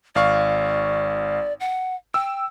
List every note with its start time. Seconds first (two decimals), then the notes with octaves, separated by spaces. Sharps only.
0.15 G#1 D5 F5 C#6
1.60 F#5
2.14 G5 E6